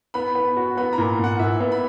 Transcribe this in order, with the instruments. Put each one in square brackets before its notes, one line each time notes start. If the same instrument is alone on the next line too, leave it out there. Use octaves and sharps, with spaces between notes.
[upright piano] B3 [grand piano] B5
[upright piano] B3
F#4
[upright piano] B3 [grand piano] B5
[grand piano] A#5
[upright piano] A#2
[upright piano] A#2 [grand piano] F#5
[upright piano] A#2 [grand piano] E5
[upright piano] B3
[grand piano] B5